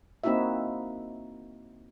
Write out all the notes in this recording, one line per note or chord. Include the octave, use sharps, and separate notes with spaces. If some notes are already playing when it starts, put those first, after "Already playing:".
A#3 C4 D#4 E4 F#4 E5